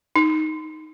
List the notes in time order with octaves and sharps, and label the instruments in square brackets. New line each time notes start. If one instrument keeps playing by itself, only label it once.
[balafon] D#4